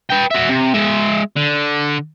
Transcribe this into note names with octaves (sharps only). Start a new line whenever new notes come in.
B4 G5
F#4 E5
C3
G#3 E5
D3